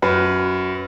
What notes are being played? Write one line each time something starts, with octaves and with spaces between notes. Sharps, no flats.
F#2 B4